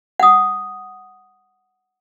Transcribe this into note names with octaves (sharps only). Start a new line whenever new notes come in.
F#5 D#6